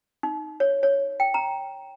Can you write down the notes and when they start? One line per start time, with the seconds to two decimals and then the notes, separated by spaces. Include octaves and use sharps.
0.23 D#4
0.60 C#5
0.83 C#5
1.20 G5
1.34 A#5